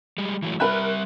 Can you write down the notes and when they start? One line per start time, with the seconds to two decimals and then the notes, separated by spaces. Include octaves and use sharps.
0.18 G3 G#3
0.42 E3 F#3 A3
0.60 G3 G#3 A#4 B4 E5 F#6